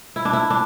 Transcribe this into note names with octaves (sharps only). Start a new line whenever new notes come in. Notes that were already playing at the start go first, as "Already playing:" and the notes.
E4
D4
E4
D4